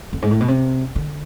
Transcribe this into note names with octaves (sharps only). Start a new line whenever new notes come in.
F2
G#2
A2
B2
C3
D3